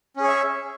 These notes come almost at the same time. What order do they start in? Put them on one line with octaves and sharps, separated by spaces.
C#4 G#4 C#5 E5